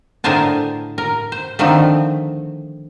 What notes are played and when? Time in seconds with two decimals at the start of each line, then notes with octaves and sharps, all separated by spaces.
0.24 A2 D3 G#4 A#4 C5 A5
0.98 A#4
1.32 C5
1.59 D3 D#3 F3 A3 C4